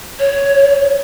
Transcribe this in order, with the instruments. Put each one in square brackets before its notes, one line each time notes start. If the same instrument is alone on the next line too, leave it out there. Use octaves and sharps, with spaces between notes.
[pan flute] C#5